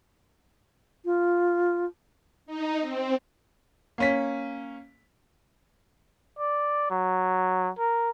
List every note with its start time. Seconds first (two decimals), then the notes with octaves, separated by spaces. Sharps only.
1.05 F4
2.46 D#4
2.80 C4
3.98 A#3 C#4 B6
6.39 D5
6.91 F#3
7.79 A#4